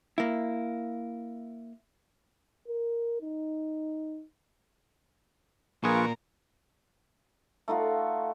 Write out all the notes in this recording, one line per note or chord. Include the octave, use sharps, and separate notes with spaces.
A#3 E4
A#4
D#4
A#1 A#2 F4 G#4 A#4 B4 C#6
A3 D#4 F4 F#4